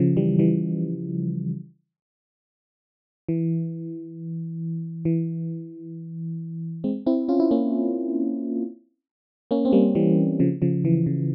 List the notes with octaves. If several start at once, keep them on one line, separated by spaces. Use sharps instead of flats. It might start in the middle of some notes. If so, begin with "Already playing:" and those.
Already playing: C#3 F3
E3 G3
E3 G3
E3
E3
G#3 C4
C4 E4
C#4 F4
E4
A#3 C#4
A#3 C#4
C4
G3 A#3
E3 G3
C#3 F3
C#3 F3
E3
C#3